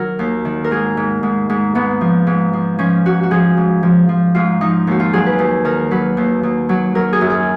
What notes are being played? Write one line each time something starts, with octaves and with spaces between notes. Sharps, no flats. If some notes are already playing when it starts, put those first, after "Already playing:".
Already playing: D#3 F#3 A#4
D#2
D#3
A#4
G#2 G#4
G#2
G#2
G#2
G#2 B3
F3
G#2
F3
F3 C#4
G#2 F#4
F#4
F3 G#4
G#2
F3
F3
G#2 F4
F3 D#4
D#2 F#4
F4
F#3 G#4
B4
D#2
D#3 A#4
F#3 B4
D#2
D#2
F#3
F#3 A#4
G#4
F#2
G#4